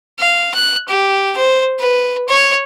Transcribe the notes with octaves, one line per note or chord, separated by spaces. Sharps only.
F5
F#6
G4
C5
B4
C#5